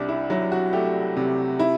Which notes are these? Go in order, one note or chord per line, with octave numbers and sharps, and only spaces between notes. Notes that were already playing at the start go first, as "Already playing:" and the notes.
Already playing: C2 D4
E4
F#3 E4
F#4
A3 G4
C3
E4